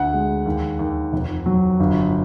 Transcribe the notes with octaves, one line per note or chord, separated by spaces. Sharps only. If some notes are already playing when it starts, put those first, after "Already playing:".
Already playing: D2 F#5
G#3
D#2
D#2
F1
F#3
G1